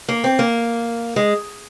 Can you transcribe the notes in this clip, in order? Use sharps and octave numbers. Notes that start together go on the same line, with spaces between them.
A#3
C4
A#3
G#3